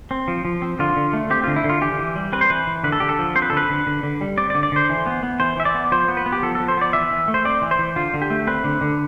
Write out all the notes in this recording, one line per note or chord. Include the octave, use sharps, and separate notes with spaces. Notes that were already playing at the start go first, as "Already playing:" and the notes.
C4
F3
F3
C4
D3 F4
D3
A3
C4 G4
D3 F4
E4
D3
F4
E3 G4
E3
G3
C4 B4
C5
E3 B4
E3
D3 B4
A4
D3 G4
A4
F3
C4 C5
B4
D3 A4
B4
D3
D3
D3
G3
C4 D5
D5
D3
D5
D3 C5
E3
B3
B3
E3 C5
E3 E5
D5
B3
F3 C5
B3
B4
B3
G4
F3 A4
A4
F3
C5
B3 D5
E3 E5
E3
A3
C5
C4 D5
E3
C5
E3
D3 F4
D3
G4
A3
C4 B4
D3
D3